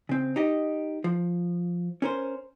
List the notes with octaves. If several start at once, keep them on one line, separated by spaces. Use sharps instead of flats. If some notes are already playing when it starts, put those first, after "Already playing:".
C#3 C4
D#4 G4 D#5
F3
C#4 A#4 C5